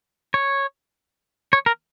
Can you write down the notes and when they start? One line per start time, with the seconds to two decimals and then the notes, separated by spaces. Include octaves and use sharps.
0.34 C#5
1.53 C#5
1.66 A#4